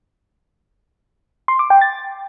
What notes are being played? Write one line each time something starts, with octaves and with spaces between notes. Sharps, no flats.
C6
D6
G5
A6